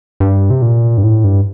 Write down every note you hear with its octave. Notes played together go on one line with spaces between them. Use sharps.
G2
C3
A#2
G2
A2
G2